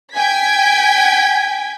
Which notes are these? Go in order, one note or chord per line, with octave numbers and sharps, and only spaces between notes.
G5 G#5 G#6 B6